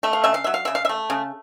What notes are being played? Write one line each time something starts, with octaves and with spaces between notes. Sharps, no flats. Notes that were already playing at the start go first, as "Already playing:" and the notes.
A3 E5
F5
C#3 E5
F5
F#3 E5
F5
C#3 E5
F5
E5
A3
C#3